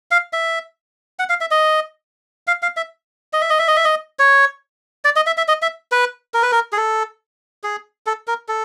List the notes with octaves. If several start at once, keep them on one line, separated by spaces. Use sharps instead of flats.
F5
E5
F#5
F5
E5
D#5
F5
F5
E5
D#5
E5
D#5
E5
D#5
E5
D#5
C#5
D5
D#5
E5
E5
D#5
E5
B4
A#4
B4
A#4
G#4
A4
G#4
A4
A#4
A4